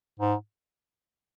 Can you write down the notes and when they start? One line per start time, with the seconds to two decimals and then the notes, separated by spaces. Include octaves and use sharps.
0.20 G#2